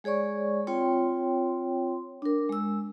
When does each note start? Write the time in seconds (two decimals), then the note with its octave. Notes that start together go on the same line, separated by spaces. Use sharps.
0.04 G#3 G#4 C#5 D5 C#6
0.67 C4 F4 C#5 G5 C6
2.22 D4 A#4
2.49 G#3 E6